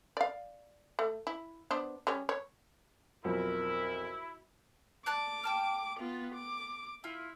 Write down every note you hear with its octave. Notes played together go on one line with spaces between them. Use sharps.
D5 F5
A3
E4
B3 D4 C5
G3 C#4 C#5
C#5
B1 F2 F3 E4 A#4
D5 A5 D6 F#6
G5 A5 F6
B3 F4
D6
E4 F4